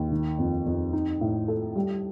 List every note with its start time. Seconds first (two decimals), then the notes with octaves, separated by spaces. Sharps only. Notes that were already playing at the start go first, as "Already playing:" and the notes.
Already playing: D#2
0.11 D#3
0.38 F2
0.66 F2
0.93 D#4
1.21 A2
1.48 A4
1.76 G3